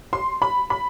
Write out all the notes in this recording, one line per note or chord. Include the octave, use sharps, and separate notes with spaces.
C6
B5
B5